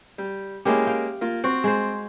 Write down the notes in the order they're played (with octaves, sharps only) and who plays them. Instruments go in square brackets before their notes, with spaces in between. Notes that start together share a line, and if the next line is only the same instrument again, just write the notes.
[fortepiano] G3
[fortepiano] G#3 A#3 C#4 [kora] E4 G4
[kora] F5 G5
[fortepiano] A#3 F4
[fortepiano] C4 [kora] F#4
[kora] G#3 C5